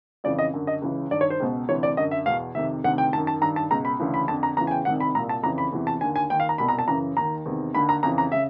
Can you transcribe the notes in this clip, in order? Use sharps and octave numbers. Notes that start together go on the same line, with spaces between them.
F2 C#3 E3 D5
D#5
F#2 D3
D#5
C#2 C#3 E3
G2 D#3 D5
C#5
C5
C#2 B2
D2 C3 E3 C#5
D5
F#2 D3 D#5
E5
E2 B2 F5
F2 C3 D#3 E5
D2 C3 D#3 F#5
G5
F#2 D#3 A5
A5
G2 D#3 A#5
A5
C#2 B2 A#5
B5
D2 C#3 E3
B5
F2 D3 A5
A#5
E2 C#3 E3 A#5
G#5
G5
C2 C3 D#3 F#5
B5
C2 A#2 A#5
A5
F2 C#3 E3 A#5
B5
E2 C3 E3
A5
D#2 D3 G#5
G#5
D#2 D#3 G5
F5
A#5
C2 B2 B5
A#5
A5
F#2 C#3 E3 A#5
D#2 D#3 A#5
E2 C3 D#3
D#2 D3 B5
A#5
F2 C#3 E3 A#5
A#5
C#3 E5